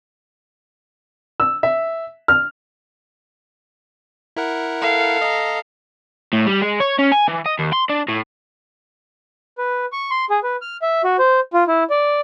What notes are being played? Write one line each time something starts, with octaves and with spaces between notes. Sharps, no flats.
E6
E5
F6
E4 A#4 F#5
A4 F5
D#5 A#5
A2
G3
G#3
C#5
C#4
G#5
E3
D#5
D#2
C6
D4
A2
B4
C#6
C6
G#4
B4
F6
E5
F#4
C5
F4
E4
D5